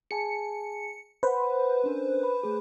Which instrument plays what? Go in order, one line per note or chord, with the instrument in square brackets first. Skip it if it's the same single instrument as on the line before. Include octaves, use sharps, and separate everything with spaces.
[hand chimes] G#4 G#5 A5 [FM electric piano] C#7
[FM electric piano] B4 C5 [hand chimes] F#5 B5
[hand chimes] C#4 D4 A#4
B5
A3 G#4